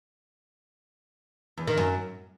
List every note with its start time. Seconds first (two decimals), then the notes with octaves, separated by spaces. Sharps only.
1.57 E2
1.67 D#3
1.77 F#2